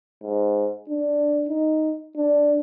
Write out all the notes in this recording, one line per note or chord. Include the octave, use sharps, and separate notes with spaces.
G#2
D4
D#4
D4